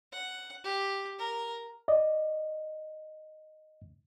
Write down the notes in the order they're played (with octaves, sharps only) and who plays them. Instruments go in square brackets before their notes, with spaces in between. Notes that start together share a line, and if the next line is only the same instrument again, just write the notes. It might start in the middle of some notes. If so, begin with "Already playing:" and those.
[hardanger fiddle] F#5
G4
A#4
[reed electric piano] D5 D#5